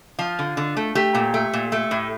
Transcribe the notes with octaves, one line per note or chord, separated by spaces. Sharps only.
F3 F4
D3
D3
A3
A3 G4
A#2
A3
A#2
A3
A2